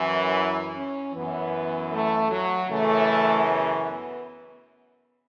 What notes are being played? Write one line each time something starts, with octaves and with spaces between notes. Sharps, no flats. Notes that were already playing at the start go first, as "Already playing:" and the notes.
Already playing: F#2 E3
C#4
F#2 E3 B3
A3
F#3
F#2 C#3 E3 A3
B3
B3